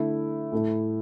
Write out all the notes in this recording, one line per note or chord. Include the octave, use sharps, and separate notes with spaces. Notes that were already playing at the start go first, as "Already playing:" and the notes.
Already playing: D3 A3 E4
A2 A3 E4